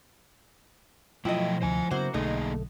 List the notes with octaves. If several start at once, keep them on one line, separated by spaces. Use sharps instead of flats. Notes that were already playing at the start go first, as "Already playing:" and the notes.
B2 F3 F#3 A3 E4 D#5 G5
D2 C3 E3 C5 G#5
C#3 F#3 A#3 B3 E4 F#4 C5
B1 D3 A3 A#3 D#4 G#4 D#5